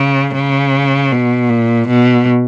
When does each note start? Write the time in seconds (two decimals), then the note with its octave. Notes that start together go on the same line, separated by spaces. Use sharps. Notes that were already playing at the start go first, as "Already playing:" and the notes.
Already playing: C#3
0.35 C#3
1.12 B2
1.49 A#2
1.88 B2